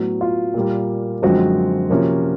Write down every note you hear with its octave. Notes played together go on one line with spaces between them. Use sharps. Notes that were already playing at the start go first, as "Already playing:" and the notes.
Already playing: A2 F#3 B3
F4
A#2 G3 A#3
F#2 D3 F3 G#3 C4 F#4
C3 F3 A#3 C#4